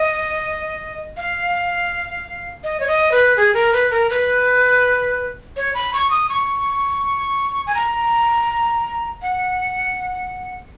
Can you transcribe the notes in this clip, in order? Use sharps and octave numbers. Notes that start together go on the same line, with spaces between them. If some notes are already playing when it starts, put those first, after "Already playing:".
Already playing: D#5
F5
D#5
C#5
D#5
B4
G#4
A#4
B4
A#4
B4
C#5
B5
C#6
D#6
C#6
G#5
A#5
F#5